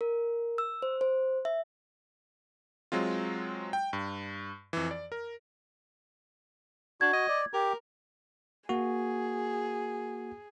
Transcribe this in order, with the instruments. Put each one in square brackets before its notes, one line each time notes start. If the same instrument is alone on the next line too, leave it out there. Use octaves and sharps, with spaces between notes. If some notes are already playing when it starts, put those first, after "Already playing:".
[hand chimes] A#4
E6
C5
C5
E5
[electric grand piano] F#3 G#3 C4 F4
G5
G2
F2 E3
D5
A#4
[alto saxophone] D4 [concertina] F#4 [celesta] G#6
[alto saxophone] D#5
[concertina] D5
[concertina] G4 [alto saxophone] A#4
[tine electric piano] A#3 F#4 [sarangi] G#4